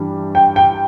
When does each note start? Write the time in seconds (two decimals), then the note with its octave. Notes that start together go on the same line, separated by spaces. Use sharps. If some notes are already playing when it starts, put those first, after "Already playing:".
Already playing: G2 E3 G3 D4
0.35 G5
0.56 G5